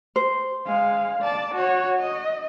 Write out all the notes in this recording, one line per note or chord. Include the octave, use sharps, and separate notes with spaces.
C5
G#3 F5
D5 A5
F#4 C#5
D#5